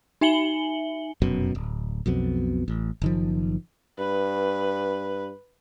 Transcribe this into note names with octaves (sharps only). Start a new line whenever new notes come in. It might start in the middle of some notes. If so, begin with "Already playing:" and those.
D#4 E5 G#5 C#7 F#7 G7
F1 F#2 B2
D1
B1 F2 B2
A1
F#1 D#3 F3
G2 B4